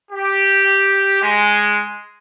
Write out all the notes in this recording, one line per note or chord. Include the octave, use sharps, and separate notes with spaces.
G4
G#3